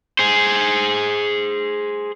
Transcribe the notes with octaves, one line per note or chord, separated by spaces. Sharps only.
G#4 C5